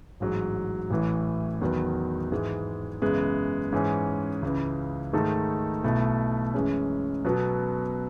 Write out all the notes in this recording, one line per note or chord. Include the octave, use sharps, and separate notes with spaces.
A1 G#2 F#3
A1 A2 E3
E2 D#3 F#3 B3
G#2 E3 G#3
F#2 C#3 E3 G#3 B3
G#2 E3 G#3 C#4 G#4
C#2 C#3 E3
G#2 D#3 A3 D#4 A4
B1 B2 A3 E4 A4
F#2 E3 G#3 C#4
B2 F#3 B3 F#4 A4